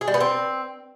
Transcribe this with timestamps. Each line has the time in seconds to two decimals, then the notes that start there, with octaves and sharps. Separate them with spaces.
0.01 G#4
0.08 G3
0.14 B3
0.20 C4